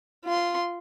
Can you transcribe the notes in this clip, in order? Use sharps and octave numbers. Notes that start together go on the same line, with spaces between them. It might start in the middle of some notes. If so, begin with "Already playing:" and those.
F4 C6